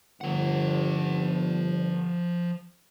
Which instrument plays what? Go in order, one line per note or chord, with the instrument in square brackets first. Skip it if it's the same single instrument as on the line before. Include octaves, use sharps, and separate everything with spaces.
[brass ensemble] G1 D3 [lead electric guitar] F3 F#5